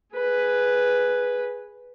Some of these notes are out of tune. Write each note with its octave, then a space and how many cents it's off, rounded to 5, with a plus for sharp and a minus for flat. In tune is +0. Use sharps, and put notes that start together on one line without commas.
G#4 +0 B4 +0